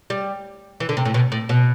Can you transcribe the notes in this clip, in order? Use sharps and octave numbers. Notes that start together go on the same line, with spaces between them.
G3
E3
D3
C3
A2
B2
A2
B2